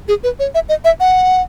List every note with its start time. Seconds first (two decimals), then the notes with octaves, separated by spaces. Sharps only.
0.08 G#4
0.24 B4
0.39 C#5
0.55 E5
0.69 D#5
0.85 E5
1.00 F#5